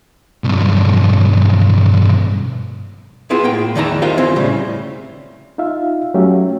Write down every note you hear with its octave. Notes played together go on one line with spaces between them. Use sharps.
B1 G2
B3 C4 E4 F4 G#4
A2 A#3 G5
E2 D#3 E3 E4 A5 A#5
F4 G4 A#4 C5 D#5 F5
E3 C4 E4
A2 C#3 G3
D#4 F4 E5 F5
F#3 A3 C#4 G4 E5